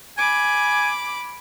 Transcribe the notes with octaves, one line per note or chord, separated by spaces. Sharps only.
G#5 B5 D6